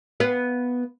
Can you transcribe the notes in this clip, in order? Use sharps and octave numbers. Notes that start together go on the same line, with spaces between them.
B3 B4 F5